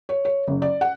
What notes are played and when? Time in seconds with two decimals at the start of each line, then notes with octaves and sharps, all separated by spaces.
0.09 C#5
0.25 C#5
0.48 F#1
0.62 D5
0.81 F#5